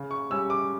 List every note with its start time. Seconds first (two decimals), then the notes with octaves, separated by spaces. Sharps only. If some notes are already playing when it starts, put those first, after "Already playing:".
Already playing: C#3
0.11 C#6
0.30 G3 C#4 E6
0.50 D6